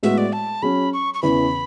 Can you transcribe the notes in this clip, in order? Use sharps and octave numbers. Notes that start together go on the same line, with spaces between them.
A2 G#3 B3 F#4 E5
D5
A5
F#3 C#4 G#4 B5
C#6
C#6
E2 C#3 E3 B5